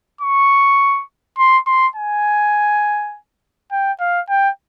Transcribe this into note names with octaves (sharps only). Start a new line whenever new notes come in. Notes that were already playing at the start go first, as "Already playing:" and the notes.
C#6
C6
C6
G#5
G5
F5
G5